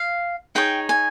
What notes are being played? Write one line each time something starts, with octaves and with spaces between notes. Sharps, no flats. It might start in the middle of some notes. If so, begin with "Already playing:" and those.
Already playing: F5
D#4 G#4 C#5 G5
G#5